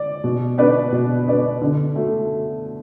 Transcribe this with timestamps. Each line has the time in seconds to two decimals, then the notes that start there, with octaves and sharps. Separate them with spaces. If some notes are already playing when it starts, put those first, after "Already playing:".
Already playing: D5
0.24 B2
0.58 B3 D4 B4 D5
0.92 B2
1.26 B3 D4 B4 D5
1.61 D3
1.95 A3 F#4